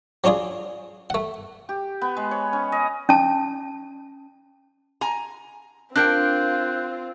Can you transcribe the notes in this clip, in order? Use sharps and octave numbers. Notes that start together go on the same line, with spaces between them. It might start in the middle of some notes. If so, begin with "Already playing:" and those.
F#3 C#4 D4 F4 G#4
A3 F#5
G4
B3
G#3
C#5
C#4
D#5
C#4 A5
G#5 A#5
C4 D4 F4 A#4 G5 F#6 G6